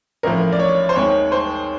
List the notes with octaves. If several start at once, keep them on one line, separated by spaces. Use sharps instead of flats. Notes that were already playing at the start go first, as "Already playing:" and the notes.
A1 A2 F3 A#4
D5
C#5
C5
D#2 D#3 G#3 C#5
C5